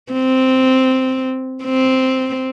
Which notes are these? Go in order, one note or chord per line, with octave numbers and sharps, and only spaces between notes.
C4
C4